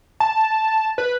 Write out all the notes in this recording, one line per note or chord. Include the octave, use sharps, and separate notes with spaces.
A5
B4